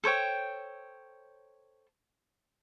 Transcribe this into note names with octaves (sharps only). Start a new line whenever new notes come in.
A4 C5 C#5 G5